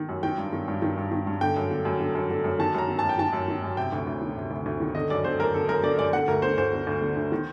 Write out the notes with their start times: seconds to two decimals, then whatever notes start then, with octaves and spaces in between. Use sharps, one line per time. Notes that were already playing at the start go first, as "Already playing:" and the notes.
Already playing: D#3
0.09 F#2
0.23 D#3 G5
0.38 G2
0.53 D#3
0.68 G2
0.82 D#3
0.97 G2
1.12 D#3
1.27 G2
1.41 D3 G5
1.56 F#2
1.71 D3
1.85 F#2
2.00 D3
2.15 F#2
2.30 D3
2.44 F#2
2.59 D#3 A5
2.74 F#2 A#5
2.89 D#3
2.99 A5
3.04 F#2
3.09 G5
3.19 D#3 A5
3.33 F#2
3.48 D#3
3.63 F#2
3.77 C3 G5
3.92 D2
4.07 D2
4.22 D#3
4.36 C3
4.51 D2
4.66 D2
4.80 D#3
4.95 D3 D#5
5.10 F#2 D5
5.24 D3 C5
5.40 F#2 A#4
5.54 D3 A4
5.68 F#2 A#4
5.83 D3 D5
5.99 F#2 D5
6.13 D3 F#5
6.28 D2 A#4
6.42 D3 C5
6.58 D2 C5
6.73 D3
6.87 D2
7.02 D3
7.17 D2
7.32 D#3